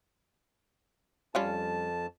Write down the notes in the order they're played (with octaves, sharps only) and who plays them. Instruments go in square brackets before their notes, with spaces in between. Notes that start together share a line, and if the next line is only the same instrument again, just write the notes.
[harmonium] F2 A5 [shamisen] G3 C#4 F4